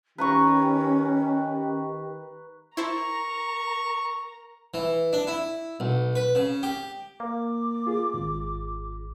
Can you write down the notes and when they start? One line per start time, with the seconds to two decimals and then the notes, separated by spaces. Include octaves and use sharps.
0.18 D#3 C#4 G4 B4 A#5 C#6
2.77 E4 A#4 C5 A5 A#5 C#6
4.74 E3
5.13 D4
5.27 E4
5.80 B1
6.15 B4
6.35 C#3
6.63 G4
7.20 A#3 D6
7.87 F4 G#4
8.14 G#1